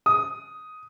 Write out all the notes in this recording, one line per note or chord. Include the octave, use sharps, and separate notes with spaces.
D#6